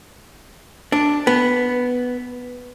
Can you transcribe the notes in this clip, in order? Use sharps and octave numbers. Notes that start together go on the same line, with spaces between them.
D4
B3